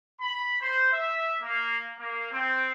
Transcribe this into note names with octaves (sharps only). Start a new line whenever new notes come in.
B5
C5
E5
A#3
A#3
C4